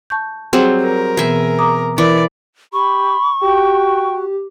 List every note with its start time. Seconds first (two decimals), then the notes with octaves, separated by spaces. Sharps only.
0.10 A5 C#6 G6
0.53 F#3 G3 C4 G#4
0.83 A#4
1.17 B2 E3 B3 G#4 E5
1.59 A#5 D6 D#6
1.98 E3 A#4 D5
2.73 G4 B5 C#6
3.42 F#4 G4 G5